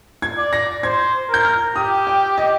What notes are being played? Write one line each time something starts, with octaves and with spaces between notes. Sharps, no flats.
G#6
D5
A#6
C5 G#6
A#4 G6
F6
G4 D#6
G5
D#5